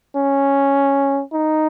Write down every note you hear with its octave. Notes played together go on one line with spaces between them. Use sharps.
C#4
D#4